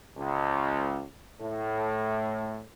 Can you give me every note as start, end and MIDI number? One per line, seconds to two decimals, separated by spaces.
0.17 1.03 37
1.41 2.59 45